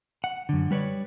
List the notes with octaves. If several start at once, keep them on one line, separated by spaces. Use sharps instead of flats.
F#5
F#2 D3
G3 B4 C#5 D5